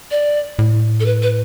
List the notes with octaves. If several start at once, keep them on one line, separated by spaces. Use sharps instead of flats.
D5
A2
A4
B4
B4